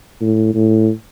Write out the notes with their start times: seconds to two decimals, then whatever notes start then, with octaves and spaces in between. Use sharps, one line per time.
0.21 A2
0.55 A2